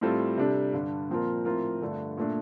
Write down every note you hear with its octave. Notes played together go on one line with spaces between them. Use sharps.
A2 G3 C4 F4 A4
C3 G3 D4 A4
G2 D3 G3
A#2 F3 C4 F4 A#4
A2 F3 C4 F4 A#4
G2 D3 A3 D4
A#2 A3 D4